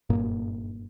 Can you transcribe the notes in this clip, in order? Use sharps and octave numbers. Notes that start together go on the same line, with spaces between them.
F#1 G2 A#2 A#3